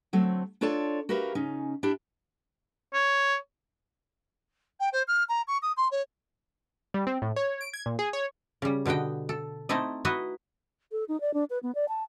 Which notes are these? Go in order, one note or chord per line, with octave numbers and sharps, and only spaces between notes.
D2 F#3 A3 C4
D4 F4 A4 C#5 D5 A5
F#4 G4 A#4 B4 E5 F5
C#3 C#4 D#4
D4 E4 G4
C#5
G5
C5
F6
A#5
C#6
D#6
C6
C#5
G3
C4
A2
C#5
D7
G#6
A#2
G#4
C#5
C#3 G3
B2 D3 B3 D#5 G5
A4
A3 C4 D#4 E4 A4 D#5
D#4 E4 F#4 B4 D#5 E5
A4
D#4
D5
D4
B4
B3
D5
A5